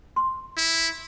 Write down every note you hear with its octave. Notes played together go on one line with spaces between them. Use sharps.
C6
E4